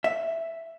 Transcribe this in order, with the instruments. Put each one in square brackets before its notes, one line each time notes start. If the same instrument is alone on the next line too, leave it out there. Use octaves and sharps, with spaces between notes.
[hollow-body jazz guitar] E5